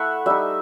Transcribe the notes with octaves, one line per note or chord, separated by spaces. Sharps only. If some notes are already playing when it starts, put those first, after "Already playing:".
Already playing: A3 E4 E5 F#5
G3 D#4 E5